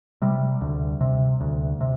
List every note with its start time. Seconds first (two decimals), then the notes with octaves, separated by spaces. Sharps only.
0.22 C3 G3
0.61 D2
1.01 C3
1.41 D2
1.81 C3